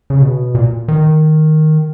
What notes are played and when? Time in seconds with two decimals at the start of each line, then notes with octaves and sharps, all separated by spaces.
0.10 C#3
0.22 B2
0.55 A#2
0.88 D#3